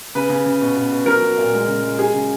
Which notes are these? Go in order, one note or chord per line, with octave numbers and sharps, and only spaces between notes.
C#3 B4
C#3
C#3
B2
B2
B2
F#3 A#4
F#3
A#2
G#3
C#3
G#3
F#3 G#4
C#3